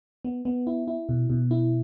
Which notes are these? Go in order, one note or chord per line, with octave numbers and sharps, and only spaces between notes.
B3
B3
E4
E4
B2
B2
E4